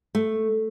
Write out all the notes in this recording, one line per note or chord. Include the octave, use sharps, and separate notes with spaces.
A3